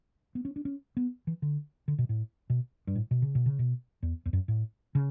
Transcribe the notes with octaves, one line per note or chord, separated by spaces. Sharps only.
B3
C#4
D4
C#4
B3
E3
D3
D3
B2
A2
B2
G2
A2
B2
C#3
B2
C#3
B2
E2
E2
F#2
A2
C#3